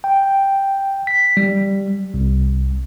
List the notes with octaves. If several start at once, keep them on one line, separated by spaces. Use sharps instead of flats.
G5
B6
G3
C2